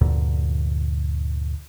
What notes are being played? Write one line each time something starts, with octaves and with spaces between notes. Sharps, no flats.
D2 G2 A#2 D3